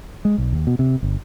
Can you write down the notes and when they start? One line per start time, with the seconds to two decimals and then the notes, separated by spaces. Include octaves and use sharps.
0.25 G#3
0.38 B1
0.53 D#2
0.67 B2
0.79 C3
1.03 G1